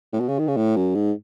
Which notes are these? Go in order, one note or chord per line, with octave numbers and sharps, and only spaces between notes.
A2
B2
C#3
D#3
C#3
A2
F#2
G#2